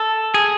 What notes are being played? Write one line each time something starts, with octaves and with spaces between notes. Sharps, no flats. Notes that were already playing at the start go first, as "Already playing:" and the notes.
Already playing: A4
G#4